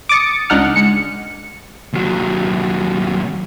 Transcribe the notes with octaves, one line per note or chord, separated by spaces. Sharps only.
D6 D#6 A6 C#7
C#2 D4 D#4 F#5 F6
G#3 C#7
D#2 F#3